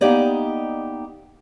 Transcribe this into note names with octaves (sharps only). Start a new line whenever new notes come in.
A#3 B3 D#4 G4 D5 D#5